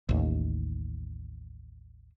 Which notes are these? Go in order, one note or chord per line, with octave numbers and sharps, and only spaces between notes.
A1 D#2